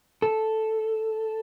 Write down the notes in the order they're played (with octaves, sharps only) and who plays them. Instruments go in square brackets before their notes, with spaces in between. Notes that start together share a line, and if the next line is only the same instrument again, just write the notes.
[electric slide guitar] A4